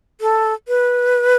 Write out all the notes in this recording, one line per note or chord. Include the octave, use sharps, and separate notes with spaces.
A4
B4